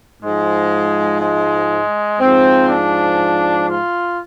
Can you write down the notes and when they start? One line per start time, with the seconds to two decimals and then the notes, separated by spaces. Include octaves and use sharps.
0.22 G#2 F3 G#3
1.21 G#3
2.20 G#2 F3 C4
2.69 D4
3.68 F4